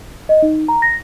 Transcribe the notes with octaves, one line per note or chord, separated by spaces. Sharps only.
D#5
D#4
A#5
A#6